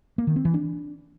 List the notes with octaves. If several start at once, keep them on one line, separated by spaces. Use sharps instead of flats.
A#3
D#3
C4
E3
D4